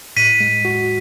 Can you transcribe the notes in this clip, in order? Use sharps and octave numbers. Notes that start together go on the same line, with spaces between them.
A2 B6 D#7
G#3
F#4